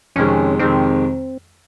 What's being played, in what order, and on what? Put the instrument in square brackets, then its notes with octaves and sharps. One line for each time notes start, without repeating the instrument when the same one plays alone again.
[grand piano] F2 C3 D#3 G#3 [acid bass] C#4
[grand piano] F2 C3 D#3 G#3 [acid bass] C4